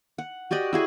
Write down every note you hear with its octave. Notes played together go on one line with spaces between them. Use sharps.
F#5
F#4 G4 D5 D#5
E4 F#4 G#4